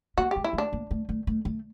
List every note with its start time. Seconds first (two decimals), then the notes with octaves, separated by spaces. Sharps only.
0.18 A#3 F#4
0.31 G#3 G4
0.44 E4
0.53 A3
0.58 D4
0.73 A#3
0.91 A3
1.09 A3
1.27 A3
1.45 A3